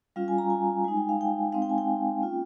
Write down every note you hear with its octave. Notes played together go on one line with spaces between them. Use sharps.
G3 C#4 F4 F5
G#5
A#5
G#5
G#3 D#4 G#5
G5
F5
G5
G#3 C4 D#4 F5
G5
G#5
G5
A#3 C#4 F4